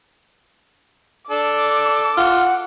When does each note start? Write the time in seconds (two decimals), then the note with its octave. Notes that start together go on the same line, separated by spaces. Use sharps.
1.31 D4 A4 D6
2.17 F4 F#5